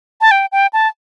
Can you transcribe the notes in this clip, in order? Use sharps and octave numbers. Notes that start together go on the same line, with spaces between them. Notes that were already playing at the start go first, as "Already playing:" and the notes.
A5
G5
G5
A5